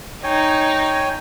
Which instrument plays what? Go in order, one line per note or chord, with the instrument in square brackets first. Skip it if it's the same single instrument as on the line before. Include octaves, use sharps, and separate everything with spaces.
[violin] D#4 [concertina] C#5 G5 G#5